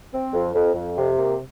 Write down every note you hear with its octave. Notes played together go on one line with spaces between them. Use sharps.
C4
F2
F2
F2
C3
A#3